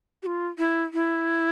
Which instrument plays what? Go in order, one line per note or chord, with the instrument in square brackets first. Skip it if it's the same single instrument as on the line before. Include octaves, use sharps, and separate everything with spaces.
[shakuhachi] G4
F4
E4
E4